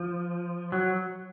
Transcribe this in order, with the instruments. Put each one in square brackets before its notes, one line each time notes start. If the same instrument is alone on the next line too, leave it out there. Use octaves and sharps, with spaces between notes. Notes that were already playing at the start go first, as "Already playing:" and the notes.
Already playing: [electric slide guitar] F3
F#3